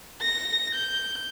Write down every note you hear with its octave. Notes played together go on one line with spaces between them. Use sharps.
A#6
G6